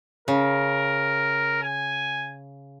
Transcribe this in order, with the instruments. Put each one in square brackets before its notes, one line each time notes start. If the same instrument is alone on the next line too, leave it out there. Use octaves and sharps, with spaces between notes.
[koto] C#3 [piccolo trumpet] A#4
[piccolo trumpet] G#5